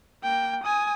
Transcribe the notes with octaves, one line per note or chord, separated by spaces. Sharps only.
A#3 G5
G#5 D#6